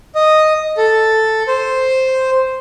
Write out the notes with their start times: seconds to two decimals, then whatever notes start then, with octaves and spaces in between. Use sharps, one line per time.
0.15 D#5
0.77 A4
1.48 C5